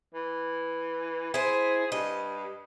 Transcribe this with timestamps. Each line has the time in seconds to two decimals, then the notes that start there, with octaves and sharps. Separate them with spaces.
0.14 E3
1.34 E4 G#4 C5
1.92 G2 D#5